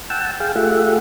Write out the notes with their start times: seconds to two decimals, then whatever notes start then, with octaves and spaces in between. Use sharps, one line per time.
0.10 F#5 G5 A5 E6
0.40 G#4 F5 G5
0.56 A3 F4 G4 G#4 E5 F#5